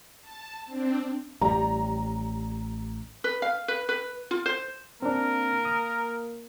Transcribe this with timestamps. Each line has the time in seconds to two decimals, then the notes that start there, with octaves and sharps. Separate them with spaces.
0.20 A5
0.66 C4 D4
1.41 A1 G3 A#5
3.24 B4
3.42 F5
3.68 B4
3.89 B4
4.31 F4
4.46 C5
5.02 A#3 C4 D4 A#4
5.65 D#6